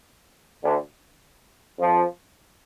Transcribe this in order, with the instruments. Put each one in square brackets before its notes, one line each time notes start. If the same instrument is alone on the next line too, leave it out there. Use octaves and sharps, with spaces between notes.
[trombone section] D2 D3
F2 F3